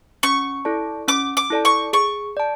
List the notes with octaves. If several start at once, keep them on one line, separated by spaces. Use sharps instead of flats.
C#4 C#6
E4 A4 D5 A5
C#4 D6
D6
E4 A4 D5 A5
C#6
G#4 C#6
D5 A5